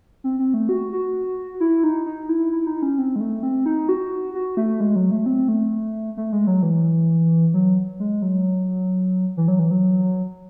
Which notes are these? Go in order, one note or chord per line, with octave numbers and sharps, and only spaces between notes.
C4
C4
A3
F#4
F#4
E4
D#4
D#4
E4
E4
D#4
C#4
C4
G#3
A3
C4
D#4
F#4
F#4
A3
G#3
F#3
A3
C4
A3
A3
G#3
F#3
E3
F#3
G#3
F#3
E3
F#3
E3
F#3